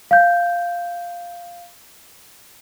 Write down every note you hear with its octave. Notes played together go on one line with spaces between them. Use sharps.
F5 G6